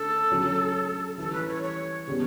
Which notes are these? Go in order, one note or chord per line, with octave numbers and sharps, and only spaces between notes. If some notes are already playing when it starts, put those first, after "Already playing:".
Already playing: D3 A3 C#4 A4
C#3 F#3 C#4
E3 G3 C#4 A4
B4
C#5
C#5
C#3 G3 B3